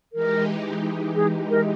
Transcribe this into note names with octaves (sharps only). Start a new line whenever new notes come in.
E3 G#3 D#4 G4 A#4
G#4
A#4